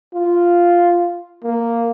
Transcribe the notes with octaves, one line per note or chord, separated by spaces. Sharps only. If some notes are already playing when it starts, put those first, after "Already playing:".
F4
A#3